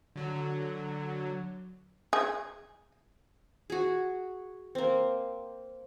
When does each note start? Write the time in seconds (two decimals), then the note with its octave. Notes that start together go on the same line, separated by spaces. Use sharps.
0.16 D3 F#3
2.13 G#4
3.70 F#4 G#4
4.75 A#3 C4